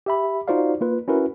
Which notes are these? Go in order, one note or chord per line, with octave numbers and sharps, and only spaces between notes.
G4 E5 B5
D#4 F4 F#4 C5 D5 F5
A#3 F4 B4
C#4 E4 F#4 A#4 B4